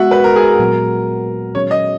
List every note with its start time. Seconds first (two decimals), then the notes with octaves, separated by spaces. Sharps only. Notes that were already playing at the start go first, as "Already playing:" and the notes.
Already playing: G#3 B3 F#4 E5 F#5
0.11 B4
0.24 A#4
0.36 G#4
0.48 A#4
0.59 A#2 F#3 B3
1.55 D#3 F#3 C#4 G#4 C#5
1.71 D#5